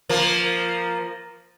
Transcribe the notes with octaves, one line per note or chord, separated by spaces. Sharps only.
F3 A#3